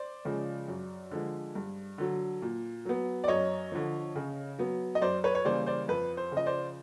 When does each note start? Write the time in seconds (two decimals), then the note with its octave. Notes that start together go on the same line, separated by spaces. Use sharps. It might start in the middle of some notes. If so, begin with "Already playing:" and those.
Already playing: C5 D5
0.25 C#3 F3 G#3
0.68 F#2
1.11 D3 F3 G#3
1.55 G2
1.98 D3 F#3
2.42 A#2
2.85 F#3 B3
3.24 D5
3.28 F#2 C#5 D#5
3.72 D3 F3
4.16 C#3
4.59 F#3 B3
4.95 D#5
5.02 F#2 C5 D5
5.24 B4 C#5
5.35 C#5
5.45 C#3 E3 G3 A#3 C5 D5
5.66 C5 D5
5.89 F2 B4
6.17 C5
6.32 C#3
6.37 F3 D#5
6.46 C5 D5